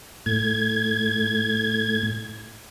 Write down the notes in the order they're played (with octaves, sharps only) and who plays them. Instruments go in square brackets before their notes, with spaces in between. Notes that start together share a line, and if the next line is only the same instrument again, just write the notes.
[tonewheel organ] A2 G#6